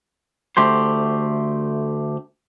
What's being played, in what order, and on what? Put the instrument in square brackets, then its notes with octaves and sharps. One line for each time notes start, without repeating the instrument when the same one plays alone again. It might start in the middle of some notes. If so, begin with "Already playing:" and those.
[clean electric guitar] D2 A3 G4 C5